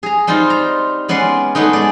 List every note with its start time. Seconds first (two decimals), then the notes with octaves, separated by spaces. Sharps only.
0.03 G#4 A#5
0.27 G3 C4 D#4 F4
0.50 A#5
1.09 G#3 B3 C#4 D5 C6
1.55 G#3 A3 B3 D#4
1.73 G#3 D5